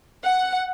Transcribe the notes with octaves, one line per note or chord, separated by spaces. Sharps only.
F#5